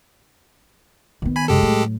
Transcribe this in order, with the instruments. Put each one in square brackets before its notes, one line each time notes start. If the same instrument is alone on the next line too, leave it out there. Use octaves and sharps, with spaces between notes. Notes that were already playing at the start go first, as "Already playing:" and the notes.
[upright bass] D#3 B3
[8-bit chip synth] G#5 B5
[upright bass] F#2 C3 [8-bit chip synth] G#3 G4 A4
[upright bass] A2 F#3